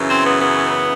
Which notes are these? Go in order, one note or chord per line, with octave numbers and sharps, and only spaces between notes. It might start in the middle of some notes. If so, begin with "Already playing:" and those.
Already playing: F#2 C#3 E3
C4
B3
B3